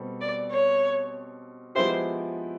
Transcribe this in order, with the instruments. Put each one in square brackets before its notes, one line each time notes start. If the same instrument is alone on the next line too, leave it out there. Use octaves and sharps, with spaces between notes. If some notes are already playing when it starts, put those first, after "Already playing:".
Already playing: [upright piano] B2 G3 C4 A4
[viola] D5
C#5
[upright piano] F3 G#3 B3 E4 G4 [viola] C5